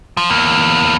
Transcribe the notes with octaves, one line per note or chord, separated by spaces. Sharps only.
F3
E2 A#3